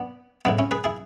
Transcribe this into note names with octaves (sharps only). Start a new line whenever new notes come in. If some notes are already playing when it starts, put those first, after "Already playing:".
Already playing: B3 D4
A2 G#3 B3 D4
C#4 E4
G#4 B4
E4 G#4